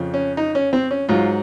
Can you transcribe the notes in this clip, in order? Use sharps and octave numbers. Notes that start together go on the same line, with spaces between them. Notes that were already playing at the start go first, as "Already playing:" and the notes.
Already playing: F2 C#3 F3
C#4
D#4
C#4
C4
C#4
G#2 F#3 F4